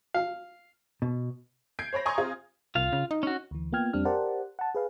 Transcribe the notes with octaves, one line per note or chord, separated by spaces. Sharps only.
F5
B2
G6 G#6 C7 D7
C5 C#5 B5 A#6
G#5 A#5 C6 C#6 D#6 G#6
C4 F4 G#4
C2 F4 F5
C#3
D#4
C#4 F#4
D2 E3
A#3 B3 F4 G5 F6 G#6
F2 G3 C4 D4 F6
G4 A#4 C5 D5 F#5 A5
F#5 A5
G#4 B4 F5